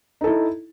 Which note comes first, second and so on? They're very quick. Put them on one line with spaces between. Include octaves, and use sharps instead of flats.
D#4 A4 E4